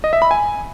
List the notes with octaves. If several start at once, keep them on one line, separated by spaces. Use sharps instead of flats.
D#5
E5
B5
G#5